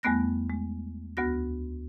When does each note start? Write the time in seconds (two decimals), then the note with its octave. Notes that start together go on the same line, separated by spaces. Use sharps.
0.03 E2 G3 A3 B3 F#6 A#6
0.50 G#3
1.17 D2 B3 F#4 A#6